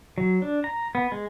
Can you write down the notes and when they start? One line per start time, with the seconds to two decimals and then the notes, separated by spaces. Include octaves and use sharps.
0.18 F#3
0.42 D4
0.64 A#5
0.95 B3
1.12 G#3